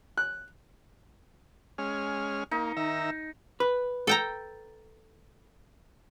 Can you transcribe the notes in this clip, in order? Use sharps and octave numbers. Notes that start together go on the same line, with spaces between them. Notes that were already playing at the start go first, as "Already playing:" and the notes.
F#6
G#3 C#4 F6
A#3 D#4
D#3 E5 A#5
B4
A4 G5 A#5